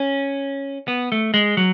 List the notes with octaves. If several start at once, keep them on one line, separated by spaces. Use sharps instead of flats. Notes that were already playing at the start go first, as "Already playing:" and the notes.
Already playing: C#4
B3
A3
G#3
F#3